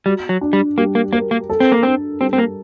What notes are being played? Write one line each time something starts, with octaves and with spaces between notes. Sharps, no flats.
G3 F#4
F#3
D4
G3
G3 A#3
A#3
A#3 A#4
A#3
A4
C4
A#3
C4 D4
G3 C4
C4
A#3